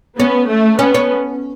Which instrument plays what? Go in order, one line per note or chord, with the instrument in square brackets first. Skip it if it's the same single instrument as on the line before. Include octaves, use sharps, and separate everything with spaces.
[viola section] B3 [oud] C#4
[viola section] A3
[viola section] B3 [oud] C#4
[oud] C#4